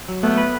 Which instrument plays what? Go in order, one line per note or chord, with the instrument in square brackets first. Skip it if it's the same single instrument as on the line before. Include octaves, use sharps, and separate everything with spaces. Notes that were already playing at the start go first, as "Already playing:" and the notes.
[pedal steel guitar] F#3
[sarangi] A3 [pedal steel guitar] B3
[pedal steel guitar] B4